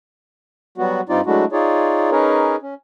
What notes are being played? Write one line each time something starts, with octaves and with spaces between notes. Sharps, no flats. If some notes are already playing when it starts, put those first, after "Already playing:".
F#3 G3 B3 F#4
G2 G3 C4 D#4 F4 D5
F#3 G#3 A3 D4 E4 F#4
D#4 F4 G#4 C#5 D5
C#4 D#4 G#4 A#4 B4 C#5
C#4